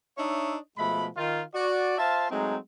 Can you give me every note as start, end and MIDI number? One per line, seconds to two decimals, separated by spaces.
0.18 0.56 62
0.18 0.56 63
0.18 0.56 73
0.18 0.56 75
0.18 0.56 76
0.78 1.07 47
0.78 1.07 53
0.78 1.07 56
0.78 1.07 57
0.78 1.07 83
1.17 1.42 51
1.17 1.42 65
1.54 1.97 66
1.54 1.97 74
1.98 2.30 65
1.98 2.30 72
1.98 2.30 76
1.98 2.30 77
1.98 2.30 81
2.31 2.56 54
2.31 2.56 56
2.31 2.56 57
2.31 2.56 60
2.31 2.56 63